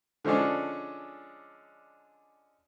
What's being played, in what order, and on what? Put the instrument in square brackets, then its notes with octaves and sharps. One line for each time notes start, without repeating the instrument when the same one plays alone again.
[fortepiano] D3 F3 G#3 C#4 D4